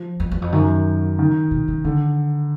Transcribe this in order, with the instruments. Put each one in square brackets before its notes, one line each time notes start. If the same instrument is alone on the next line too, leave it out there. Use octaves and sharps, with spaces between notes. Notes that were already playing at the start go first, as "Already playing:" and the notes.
Already playing: [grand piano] F3
[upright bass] F2
E2
F2
[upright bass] F#2 [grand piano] D#3
[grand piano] D#3
[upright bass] B2
C#3
[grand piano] D3 [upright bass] D#3